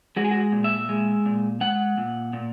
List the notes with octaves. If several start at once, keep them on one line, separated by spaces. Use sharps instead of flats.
G#3 F#4
G#4
F#4
A#2
E5
G#3
A#2
G#3 F#5
A#2
A#2